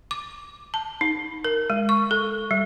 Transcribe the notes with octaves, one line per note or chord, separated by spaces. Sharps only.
D6
A5
D#4
A#4
G#3
C#6
A4
G3